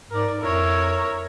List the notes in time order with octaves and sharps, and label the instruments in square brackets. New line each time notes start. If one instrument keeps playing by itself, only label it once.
[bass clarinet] G#2 [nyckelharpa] A#4 D5
[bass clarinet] F2 [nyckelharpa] E4 [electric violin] A#4 C#5